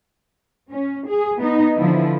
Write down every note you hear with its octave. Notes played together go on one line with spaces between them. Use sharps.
C#4
G#4
B3 D#4
D3 E3 F3 E4